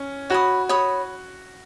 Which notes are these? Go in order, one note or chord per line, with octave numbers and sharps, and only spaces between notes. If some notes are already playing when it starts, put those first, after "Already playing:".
Already playing: C#4
F#4 C#5 B5 D#6
C#5 B5 D#6